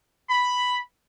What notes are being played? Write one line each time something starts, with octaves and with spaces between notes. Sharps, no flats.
B5